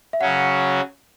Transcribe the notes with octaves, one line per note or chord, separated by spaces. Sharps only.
E5
C#3 F#3 C#4 F#4 F#5